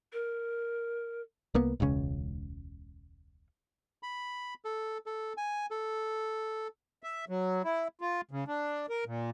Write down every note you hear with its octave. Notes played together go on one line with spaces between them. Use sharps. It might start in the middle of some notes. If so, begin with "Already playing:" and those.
A#4
C2 A#3 B3
E1 C#2 C#3 C#4
B5
A4
A4
G#5
A4
E5
F#3
E4
F4
C#3
D4
A#4
A#2